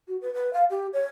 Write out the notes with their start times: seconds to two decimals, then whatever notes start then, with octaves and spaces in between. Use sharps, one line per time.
0.08 F#4
0.21 B4
0.34 B4
0.53 F5
0.70 G4
0.93 C#5